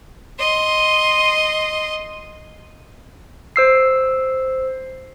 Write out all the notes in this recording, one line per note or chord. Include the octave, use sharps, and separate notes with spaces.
D#5 C6
C5 E6 C7